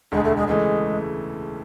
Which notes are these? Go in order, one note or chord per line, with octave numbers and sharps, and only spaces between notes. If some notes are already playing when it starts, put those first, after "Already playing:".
E1 D2 D3 G#3
A3
G#3
C#3 E3 G#3 A3